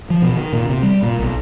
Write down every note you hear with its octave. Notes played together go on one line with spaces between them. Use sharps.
F3
B2
D#3
A#2
C3
G3
A#2
B1